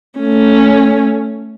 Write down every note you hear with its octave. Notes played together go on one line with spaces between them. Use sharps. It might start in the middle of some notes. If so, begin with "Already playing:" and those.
A3 C#4